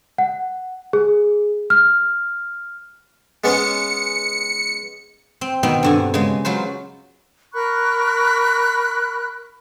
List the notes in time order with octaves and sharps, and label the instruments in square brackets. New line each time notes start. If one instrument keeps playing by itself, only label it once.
[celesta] F#5
G#4
F6
[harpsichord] G#3 B3 C#4 [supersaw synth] C#7
[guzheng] C4
B2 D#3 B3 C4
G2 D3 G#5
C#3 G#3
F#3 F4 B4 C5
[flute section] A#4 B5 C#6 F#6